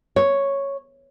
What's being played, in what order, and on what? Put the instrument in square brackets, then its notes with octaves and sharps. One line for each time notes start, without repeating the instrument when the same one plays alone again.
[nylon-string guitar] C#5